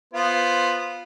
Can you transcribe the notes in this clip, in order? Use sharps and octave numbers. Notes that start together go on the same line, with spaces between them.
B3 F4 C5